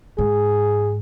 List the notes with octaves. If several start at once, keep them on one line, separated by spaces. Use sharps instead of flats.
G#2 G#4